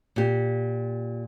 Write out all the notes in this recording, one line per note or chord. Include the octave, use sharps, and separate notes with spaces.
A#2 G4